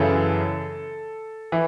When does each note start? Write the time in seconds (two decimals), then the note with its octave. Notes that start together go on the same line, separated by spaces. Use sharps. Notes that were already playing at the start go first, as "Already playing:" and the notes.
Already playing: F#2 C#3 E3 A4
1.52 E3